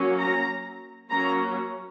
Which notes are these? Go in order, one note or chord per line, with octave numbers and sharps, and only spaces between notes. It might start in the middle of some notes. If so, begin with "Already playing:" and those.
Already playing: F#3 A#3 C#4
A#5
F#3 A#3 C#4 A#5